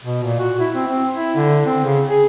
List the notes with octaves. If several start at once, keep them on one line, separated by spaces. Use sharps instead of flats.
B2
A#2
F#4
E4
C4
C4
E4
D3
C4
C#3
G#4